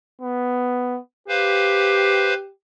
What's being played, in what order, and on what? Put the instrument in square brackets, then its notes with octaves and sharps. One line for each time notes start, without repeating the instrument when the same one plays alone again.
[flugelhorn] B3
[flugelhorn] G4 [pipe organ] B4 C5 F5